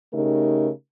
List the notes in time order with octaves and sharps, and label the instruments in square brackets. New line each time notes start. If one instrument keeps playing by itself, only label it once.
[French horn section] C#3 A3 D#4 G4 A#4